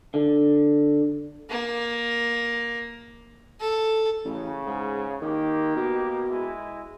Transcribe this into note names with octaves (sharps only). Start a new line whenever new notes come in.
D3
A#3
A4
A1 C#3
G#2
D#3 A#3 G4
B2
G#3 E4